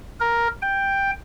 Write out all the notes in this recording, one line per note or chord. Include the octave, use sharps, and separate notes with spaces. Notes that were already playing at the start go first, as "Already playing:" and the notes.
A#4
G5